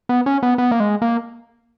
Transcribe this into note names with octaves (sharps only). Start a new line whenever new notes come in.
B3
C#4
B3
B3
A#3
G#3
A#3